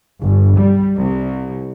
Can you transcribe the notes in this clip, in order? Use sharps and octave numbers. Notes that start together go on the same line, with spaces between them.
G1
G3
C2